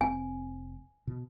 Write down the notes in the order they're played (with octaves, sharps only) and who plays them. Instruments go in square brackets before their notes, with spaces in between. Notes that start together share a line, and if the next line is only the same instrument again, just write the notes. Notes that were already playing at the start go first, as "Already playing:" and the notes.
[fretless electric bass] F1 C4 [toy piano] G#5
[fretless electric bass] B2